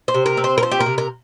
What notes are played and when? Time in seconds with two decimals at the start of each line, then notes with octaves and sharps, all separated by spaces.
0.08 C5
0.14 C3
0.26 A#4
0.37 C4
0.44 C5
0.58 A#4
0.62 F3 C5
0.72 G4
0.80 A#4
0.86 C3
0.98 A#4